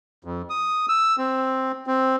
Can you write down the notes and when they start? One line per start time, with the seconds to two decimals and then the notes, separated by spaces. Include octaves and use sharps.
0.25 F2
0.50 D#6
0.89 E6
1.18 C4
1.87 C4